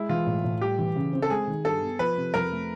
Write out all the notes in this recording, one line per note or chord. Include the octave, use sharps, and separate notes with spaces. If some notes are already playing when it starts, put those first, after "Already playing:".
Already playing: G#3 E4
E3 F4
A2
A2
G3 G4
E3
C#3
C4
A4
G#3 G#4
D#3
G2 A4
B3
F3 B4
C3
F2 A#4
A3